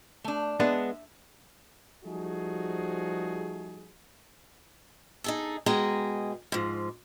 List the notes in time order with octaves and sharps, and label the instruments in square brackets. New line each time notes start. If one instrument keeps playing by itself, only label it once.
[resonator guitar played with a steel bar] A3 D4
[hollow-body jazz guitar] G#3 B3 D4 [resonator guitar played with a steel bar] E5
[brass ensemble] F3 G3 A3 D#4 F#4 G#4
[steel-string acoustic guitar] D#4 G#4 A4
B2 G#3 G#4 D#5 G5 A#5
G#2 F3